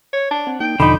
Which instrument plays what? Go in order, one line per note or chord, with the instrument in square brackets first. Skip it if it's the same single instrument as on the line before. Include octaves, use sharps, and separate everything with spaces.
[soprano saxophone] C#5
D4
[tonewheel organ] C4 F#5
[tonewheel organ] A#3 D#4 [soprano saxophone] G5
[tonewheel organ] E2 B2 F3 [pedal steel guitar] D3 D#4 [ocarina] B5